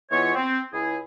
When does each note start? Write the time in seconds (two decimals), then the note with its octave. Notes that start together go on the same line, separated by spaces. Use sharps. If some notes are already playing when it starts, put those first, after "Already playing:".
0.11 E3 G#3 B3 F4 C#5
0.35 C4
0.73 C#2 E4 G#4